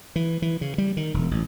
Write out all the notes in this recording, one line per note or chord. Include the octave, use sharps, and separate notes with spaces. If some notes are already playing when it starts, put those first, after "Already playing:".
E3
E3
C#3
G3
D#3
E1
A1